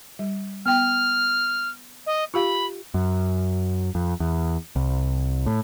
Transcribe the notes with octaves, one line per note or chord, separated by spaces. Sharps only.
G3
B3 G5 F6
D#5
F4 G4 F5 B5
F#2
F2
E2
C2
A2